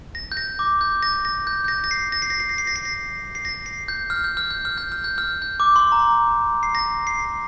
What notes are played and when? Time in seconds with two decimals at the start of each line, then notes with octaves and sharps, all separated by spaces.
0.15 A#6
0.32 G6
0.37 A#6
0.59 D6
0.81 G6
1.03 A#6
1.25 A#6
1.47 G6
1.64 G6
1.68 A#6
1.84 A#6
1.91 C7
2.12 A#6
2.22 C7
2.30 A#6
2.40 C7
2.49 A#6
2.58 C7
2.67 A#6
2.76 C7
2.85 A#6
3.35 C7
3.45 A#6
3.66 C7
3.88 G6
4.10 F6
4.24 G6
4.37 F6
4.51 G6
4.65 F6
4.78 G6
4.92 F6
5.04 G6
5.18 F6
5.42 G6
5.60 D6
5.76 C6
5.92 A#5
6.63 C7
6.75 A#6
7.07 C7